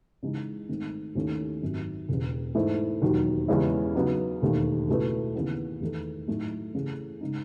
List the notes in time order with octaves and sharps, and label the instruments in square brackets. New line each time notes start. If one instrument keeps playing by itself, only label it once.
[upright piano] C#3 E3 G#3 D#4
G#1 G#2 D#3 A3
D#2 D#3 A3 C#4 E4
G#1 F#2 D#3
E1 E2 C#3
G#2 E3 A3 E4
E1 D#2 D#3 F#3
E2 C#3 G#3 C#4 E4
C#3 F#3 B3 D#4
E1 D#2 D#3 A3
C#2 B2 A3 E4 B4
D#2 C#3 E3 B3
E2 D#3 A3 D#4 A4
A2 F#3 A3 D#4 A4
C#3 E3 A3 C#4 G#4
C#3 G#3 D#4